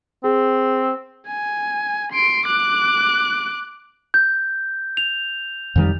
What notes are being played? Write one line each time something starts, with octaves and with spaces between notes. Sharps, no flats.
C4 G#4
G#5
C6 D7
D6 F#6
G6
F7
F2 D#3 G3